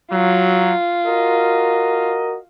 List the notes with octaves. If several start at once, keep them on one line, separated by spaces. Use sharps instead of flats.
F#3 F4
F#4 A#4 D#5